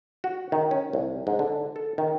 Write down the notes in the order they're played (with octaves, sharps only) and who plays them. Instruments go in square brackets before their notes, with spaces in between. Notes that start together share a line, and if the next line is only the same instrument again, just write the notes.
[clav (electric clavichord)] F#4
D#3
C#4
C2
G#2
D3
A4
D#3